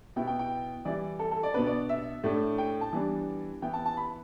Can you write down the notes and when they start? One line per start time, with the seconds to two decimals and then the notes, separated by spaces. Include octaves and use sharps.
0.16 B2 B3 E4 G5
0.27 G5
0.39 G5
0.85 E3 G3 E4 D5
1.19 A4
1.31 A4
1.43 D5
1.54 B2 B3 D4 B4
1.66 D5
1.89 E5
2.24 A2 A3 D4
2.58 G5
2.81 A5
2.93 E3 G3 B3 D4
3.62 E3 B3 E4 G5
3.73 A5
3.86 A5
3.97 B5